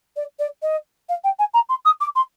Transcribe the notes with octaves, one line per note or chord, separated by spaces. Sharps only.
D5
D5
D#5
F5
G5
G#5
A#5
C6
D#6
D6
C6